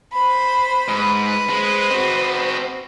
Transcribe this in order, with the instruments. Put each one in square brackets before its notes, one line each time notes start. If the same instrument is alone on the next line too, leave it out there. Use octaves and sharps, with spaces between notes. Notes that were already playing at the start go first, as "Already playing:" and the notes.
[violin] C5 B5
[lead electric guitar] G#2 [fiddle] B4
[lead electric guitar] G#3 [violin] C5 D#5
[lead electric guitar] C4 F#4